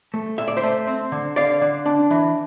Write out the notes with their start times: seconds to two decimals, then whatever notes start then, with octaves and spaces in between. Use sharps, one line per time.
0.14 A3
0.38 A#2 E5
0.48 D5
0.57 C5 E5
0.63 A3
0.87 C4
1.12 D3
1.36 D3 D5 F5
1.61 D3
1.86 D4
2.11 E3